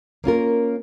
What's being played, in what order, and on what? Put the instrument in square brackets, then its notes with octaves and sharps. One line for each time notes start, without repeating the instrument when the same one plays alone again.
[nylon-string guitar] A#3 C#4 F4 A#4